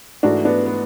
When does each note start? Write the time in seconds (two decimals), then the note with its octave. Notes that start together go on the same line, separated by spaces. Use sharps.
0.23 G#2 E3 A3 D4 F#4
0.45 B3 D4
0.66 B3